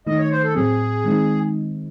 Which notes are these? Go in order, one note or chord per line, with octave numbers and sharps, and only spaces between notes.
D#3 A3 D#4 D#5
C#5
C5
A4
A2 F#3 C4 G#4
D#3 G#3 C4 D#4